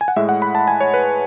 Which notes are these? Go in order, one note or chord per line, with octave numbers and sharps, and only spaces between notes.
G#5
F#5
A2 G#3 E5
F#5
B5
A5
G#5
C#5
B4